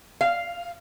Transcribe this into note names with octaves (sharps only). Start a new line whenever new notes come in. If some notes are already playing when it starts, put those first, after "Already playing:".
F5